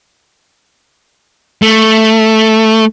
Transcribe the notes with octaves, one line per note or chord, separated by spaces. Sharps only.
A3